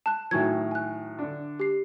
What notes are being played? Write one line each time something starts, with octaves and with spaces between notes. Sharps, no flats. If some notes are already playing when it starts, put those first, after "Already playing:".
A5 F#6
A2 D#3 F#3 G#5 C#6 G#6
G#5 F#6
D3 D4
G4 C7